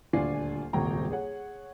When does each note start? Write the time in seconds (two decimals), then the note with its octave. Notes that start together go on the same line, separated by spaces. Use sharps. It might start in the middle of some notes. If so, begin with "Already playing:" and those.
0.13 D#1 D2 D4 F4 G#5 C7
0.73 D#1 G#1 C#2 G5 A#5
1.10 G#4 C#5 F#5